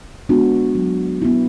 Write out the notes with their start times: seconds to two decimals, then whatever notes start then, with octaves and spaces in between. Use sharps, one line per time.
0.29 G#3 B3 D4 F#4
0.75 F#3
1.22 B3 E4